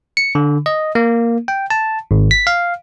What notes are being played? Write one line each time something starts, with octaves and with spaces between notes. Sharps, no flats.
C#7
D3
D#5
A#3
G5
A5
G#1
B6
F5